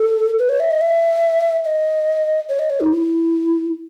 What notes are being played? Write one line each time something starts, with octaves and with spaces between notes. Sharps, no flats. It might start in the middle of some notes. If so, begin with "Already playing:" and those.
Already playing: A4
B4
C#5
E5
D#5
E5
D#5
C#5
D#5
C#5
D#4
E4